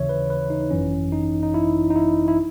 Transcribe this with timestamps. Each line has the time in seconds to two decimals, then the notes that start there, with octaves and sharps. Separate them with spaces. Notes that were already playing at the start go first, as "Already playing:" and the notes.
Already playing: D#2 C#3 E3 C#5 E5
0.09 B4
0.30 B4
0.50 D#4
0.71 G#1 F#2 E3 C#4
1.12 D#4
1.43 D#4
1.54 E4
1.90 D#4
1.95 E4
2.28 E4